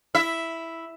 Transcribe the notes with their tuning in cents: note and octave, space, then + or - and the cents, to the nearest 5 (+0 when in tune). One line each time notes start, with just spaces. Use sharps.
E4 +0 E5 +0